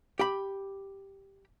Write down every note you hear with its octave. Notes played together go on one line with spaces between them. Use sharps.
G4 B5